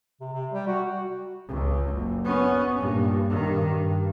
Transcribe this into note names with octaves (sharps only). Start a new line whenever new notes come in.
C3
C3
G3
F#4
C#2
F#1
B3 C#4
G2 A#2
G2 D#3
G2